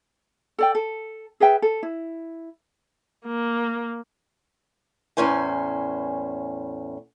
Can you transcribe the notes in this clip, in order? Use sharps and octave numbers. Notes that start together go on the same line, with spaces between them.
A4 D5 G5
A4
G#4 B4 E5 G5
A4
E4
A#3
E2 A2 C#4 C5 G#5